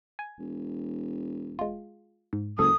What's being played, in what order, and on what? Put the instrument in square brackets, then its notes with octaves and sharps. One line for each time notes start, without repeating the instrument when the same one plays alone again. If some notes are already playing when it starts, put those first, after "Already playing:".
[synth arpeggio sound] G#5
[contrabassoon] E1
[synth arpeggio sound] G#3 F4
G#2
[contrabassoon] F#1 [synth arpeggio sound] C#2 A4 [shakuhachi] D#6